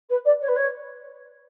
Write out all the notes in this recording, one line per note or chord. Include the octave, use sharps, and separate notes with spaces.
B4
D5
C#5
B4
C#5